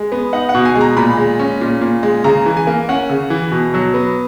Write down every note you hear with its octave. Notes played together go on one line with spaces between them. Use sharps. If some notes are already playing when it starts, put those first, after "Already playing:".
Already playing: G#3
B3
D#4 F#5
F#5
B2
G#5
G#3
A#5
A#2 B5
G#3
C#4
A#2
A#2
G#3
C#3 A#5
E3
G#5
A#3
C#4 F#5
C#3
E3
B2
F#3
B3